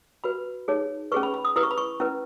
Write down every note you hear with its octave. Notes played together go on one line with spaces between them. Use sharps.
F#4 B4 B5
D#4 G#4 C#5
C#4 G#4 B4 C#6
B5
B5
D#6
E4 B4 D#6
C#6
B5
C#6
C#4 E4 B4